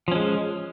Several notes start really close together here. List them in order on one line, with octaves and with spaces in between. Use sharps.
F3 C#4 G#3